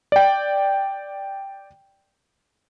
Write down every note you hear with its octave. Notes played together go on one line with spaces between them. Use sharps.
D5 G5